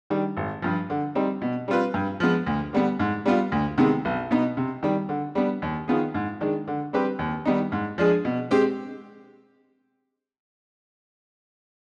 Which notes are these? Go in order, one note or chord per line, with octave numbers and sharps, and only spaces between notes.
D#3 G3 D4
G#1
G2 F3
D3
G3 C4 D#4
B2
G3 C4 F4 B4
G2
F3 G#3 B3
D2
D3 G3 B3
G#2
G3 B3 F4
D2
C3 D#3 G#3 B3
B1
B2 B3 D#4
C3
D#3 G3
D3
G3 B3 D4
D#2
D#3 B3 F4 G#4
G#2
D#3 G#3 D4
D3
G3 C4 G4 B4
D#2
D#3 G3 B3 D#4
G#2
F3 G#3 D4 G#4
B2
G#3 C4 G4